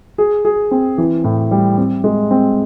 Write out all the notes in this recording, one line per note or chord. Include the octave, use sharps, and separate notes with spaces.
G#4
G#4
C4
E3
A2
G3
C4
G#3
C4